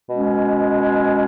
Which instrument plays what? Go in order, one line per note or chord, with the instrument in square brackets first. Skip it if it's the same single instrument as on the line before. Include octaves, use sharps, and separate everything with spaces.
[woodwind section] B2 G#3 C#4